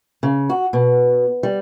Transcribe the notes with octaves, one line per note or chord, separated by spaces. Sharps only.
C#3
F#4
B2
G3